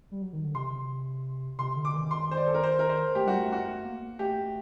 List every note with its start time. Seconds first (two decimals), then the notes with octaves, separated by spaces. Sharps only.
0.11 G3
0.22 F#3
0.33 D#3
0.44 D3
0.55 C3 C6
1.58 C3 C6
1.76 D3
1.85 D6
1.94 D#3
2.11 C6
2.31 C5
2.37 D5
2.46 A4
2.55 A#4
2.63 C5
2.79 A#4
2.89 C5
3.15 A3 G4
3.26 G3 F#4
3.37 A3
3.52 F#4
3.67 A3
3.85 A#3
4.02 A#3
4.19 A3 G4